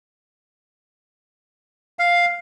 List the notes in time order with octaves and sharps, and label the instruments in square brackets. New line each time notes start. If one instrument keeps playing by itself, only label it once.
[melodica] F5